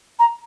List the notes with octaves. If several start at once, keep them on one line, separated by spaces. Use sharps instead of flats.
A#5